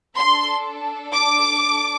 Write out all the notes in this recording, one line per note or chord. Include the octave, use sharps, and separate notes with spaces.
D4 A4 C6
D6